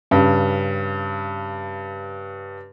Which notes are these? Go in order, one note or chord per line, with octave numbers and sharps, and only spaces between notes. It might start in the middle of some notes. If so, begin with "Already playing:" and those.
G2 C#3